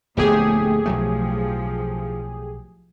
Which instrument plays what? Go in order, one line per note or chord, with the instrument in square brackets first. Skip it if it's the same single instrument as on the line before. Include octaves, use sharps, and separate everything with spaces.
[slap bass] D1 A#1 B3 [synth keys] A2 G4 G#4 [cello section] A3
[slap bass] B1 F#3 A3 [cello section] F3